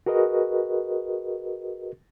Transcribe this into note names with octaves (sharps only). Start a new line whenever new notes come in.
F#4 G#4 A#4 B4 D#5